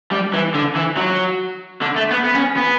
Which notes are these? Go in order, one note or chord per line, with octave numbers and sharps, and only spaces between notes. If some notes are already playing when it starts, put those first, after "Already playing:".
G3
E3
D3
E3
F#3
D3
A3
B3
B3
C#4
B3